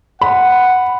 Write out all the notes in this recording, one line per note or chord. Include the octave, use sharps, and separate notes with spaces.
F#5 B5